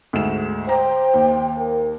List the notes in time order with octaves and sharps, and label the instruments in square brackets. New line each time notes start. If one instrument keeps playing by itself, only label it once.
[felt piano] D2 G#2 E7
[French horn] C5 [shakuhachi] G5 [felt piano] A#5
[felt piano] D#2
[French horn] A#4